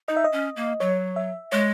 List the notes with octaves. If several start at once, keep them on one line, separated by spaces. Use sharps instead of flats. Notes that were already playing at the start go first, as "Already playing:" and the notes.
D#4 D#5
E5
D#5
C#4
A#3
F#3 C#5
E5
G#3 C#5